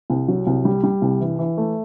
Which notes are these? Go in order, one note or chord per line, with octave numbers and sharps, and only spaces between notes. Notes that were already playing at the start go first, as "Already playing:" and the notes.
C2
F#3
C2
G3
G3
C2
E3
E3
A3